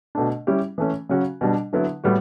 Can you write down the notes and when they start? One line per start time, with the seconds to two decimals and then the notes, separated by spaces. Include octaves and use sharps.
0.15 B2 A3 D4
0.47 G3 C#4 E4 G4
0.78 E3 A3 C#4
1.09 C#3 F#3 C#4 F#4
1.41 B2 G3 D4
1.73 D3 F#3 B3 E4
2.04 A2 G3 B3 F#4